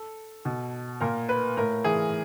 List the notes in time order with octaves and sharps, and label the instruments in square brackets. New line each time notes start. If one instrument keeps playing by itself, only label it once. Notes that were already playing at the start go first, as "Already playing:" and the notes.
Already playing: [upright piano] A4
B2
A#2 A#4
B4
A2 A#4
E3 G#4